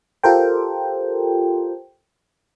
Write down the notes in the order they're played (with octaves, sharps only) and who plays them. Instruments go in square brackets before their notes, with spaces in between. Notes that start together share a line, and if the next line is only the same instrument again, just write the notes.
[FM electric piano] F4 G4 A4 A#4 C5 G5